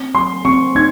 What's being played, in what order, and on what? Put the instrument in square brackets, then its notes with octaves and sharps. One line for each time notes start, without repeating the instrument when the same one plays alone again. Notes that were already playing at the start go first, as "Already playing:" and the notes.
Already playing: [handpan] C4
[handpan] F#3 [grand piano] C6
[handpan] C4 [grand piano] C#6
[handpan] D#4 [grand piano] G#6